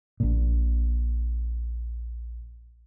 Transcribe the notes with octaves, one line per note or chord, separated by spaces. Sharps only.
A#1 A#2